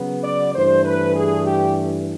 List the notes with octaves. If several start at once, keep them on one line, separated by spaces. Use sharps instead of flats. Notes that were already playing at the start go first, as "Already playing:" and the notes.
Already playing: C#3 F#3 B3
D5
G2 E3 A3 C5
B4
G#4
G4